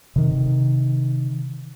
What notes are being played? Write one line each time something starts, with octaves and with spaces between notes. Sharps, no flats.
C3 D#3